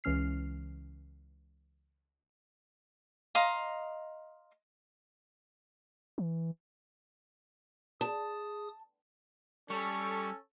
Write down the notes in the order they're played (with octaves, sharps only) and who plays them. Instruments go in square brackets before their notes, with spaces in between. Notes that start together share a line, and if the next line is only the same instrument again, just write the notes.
[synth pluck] C#2 E3 C#4 F6 C7
[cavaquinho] D#5 F5 A#5 C6
[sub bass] E3
[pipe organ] G#4 D#6 [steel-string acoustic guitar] A5
[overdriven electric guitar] G3 [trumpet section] C#4 A4 [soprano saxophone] C#6